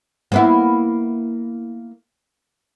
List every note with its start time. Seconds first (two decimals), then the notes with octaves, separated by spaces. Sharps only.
0.32 A#3 B3 E4